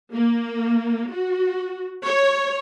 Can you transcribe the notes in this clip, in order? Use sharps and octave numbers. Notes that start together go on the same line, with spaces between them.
A#3
F#4
C#5